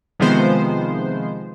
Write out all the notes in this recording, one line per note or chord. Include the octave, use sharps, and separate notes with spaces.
C3 D#3 F3 G#3 B3 C5